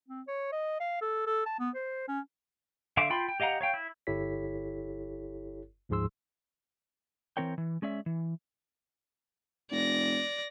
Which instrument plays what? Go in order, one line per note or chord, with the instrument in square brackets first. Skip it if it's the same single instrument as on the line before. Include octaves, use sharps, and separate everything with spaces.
[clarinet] C4
C#5
D#5
F5
A4
A4
A5
B3
C5
C#4
[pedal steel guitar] D3 E5 F5 C6 D6
F4 G5 B5 C6
G5
G4 D#5 F5 F#5 A#5
C#5 F5 G5
E4
[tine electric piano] G1 E4 G4 A4 C#5 B6
D2 G#2 F3 G#4 C6 E6
[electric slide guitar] E3 F3 C4 A#4 C#5 G5
E3
G#3 C#4 D5 E5
E3
[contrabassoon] F1 [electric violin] D5 A#6